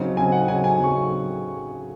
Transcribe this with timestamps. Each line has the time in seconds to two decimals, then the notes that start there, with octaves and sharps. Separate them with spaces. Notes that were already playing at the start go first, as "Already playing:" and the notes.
Already playing: C#3 F#3 C4 D#4
0.17 C#3 F#3 C4 D#4 G#5
0.32 F#5
0.48 C#3 F#3 C4 D#4 G#5
0.64 G#5
0.79 C#3 F#3 C4 D#4 C#6